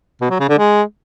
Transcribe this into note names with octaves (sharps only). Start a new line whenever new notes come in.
B2
F#3
C#3
D3
G#3